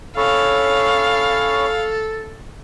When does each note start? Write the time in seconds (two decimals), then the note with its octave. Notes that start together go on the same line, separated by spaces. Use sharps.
0.17 C#4 E4 A4 C#5 F5